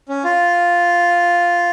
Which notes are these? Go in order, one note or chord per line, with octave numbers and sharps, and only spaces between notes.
C#4
F4